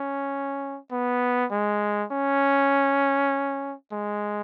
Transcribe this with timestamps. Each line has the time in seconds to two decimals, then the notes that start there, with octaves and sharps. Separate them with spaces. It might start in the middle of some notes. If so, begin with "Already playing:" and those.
Already playing: C#4
0.91 B3
1.51 G#3
2.12 C#4
3.92 G#3